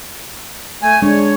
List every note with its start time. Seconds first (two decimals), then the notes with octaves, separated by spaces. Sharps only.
0.82 A3 G#5
1.02 G#3 D4 C#5